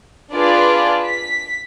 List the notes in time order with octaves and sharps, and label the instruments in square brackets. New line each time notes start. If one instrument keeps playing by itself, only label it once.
[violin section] D4 F4 G#4 B4 D5
B6